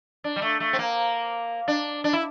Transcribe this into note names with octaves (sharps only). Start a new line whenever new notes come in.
D4
G3
A3
A3
C4
A#3
D4
D4
E4